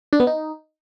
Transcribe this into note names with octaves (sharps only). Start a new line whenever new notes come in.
D4
B3
D#4